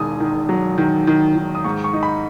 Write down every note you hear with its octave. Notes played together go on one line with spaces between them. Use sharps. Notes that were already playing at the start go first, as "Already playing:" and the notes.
Already playing: E1 E2 D#3 G#5 D#6
D#3
F#3
D#3
D#3
D#3
D#6
G#2 C#6
C#6
D#4
B5